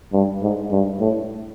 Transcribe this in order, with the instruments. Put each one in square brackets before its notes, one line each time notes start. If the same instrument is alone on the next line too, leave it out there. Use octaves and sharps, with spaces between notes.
[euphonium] G2
G#2
G2
A2